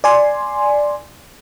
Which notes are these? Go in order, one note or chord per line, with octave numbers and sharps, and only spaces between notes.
D5 G#5 C6